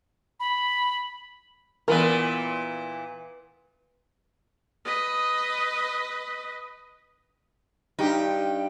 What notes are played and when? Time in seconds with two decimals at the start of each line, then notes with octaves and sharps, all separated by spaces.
0.40 B5
1.88 A#2 E3 B3 A#4
4.85 B4 D#5
7.99 G2 D#4 G4